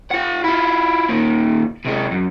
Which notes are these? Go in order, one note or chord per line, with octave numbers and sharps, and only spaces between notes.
F4 F#5
E4 F4
A#2 D#3
C3 G#3
F#2